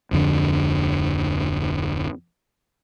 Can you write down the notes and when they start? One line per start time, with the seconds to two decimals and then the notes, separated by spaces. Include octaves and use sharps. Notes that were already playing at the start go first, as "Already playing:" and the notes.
0.11 D1 F2 D3